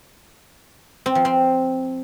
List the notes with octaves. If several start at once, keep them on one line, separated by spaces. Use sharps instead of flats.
C4
F3
C4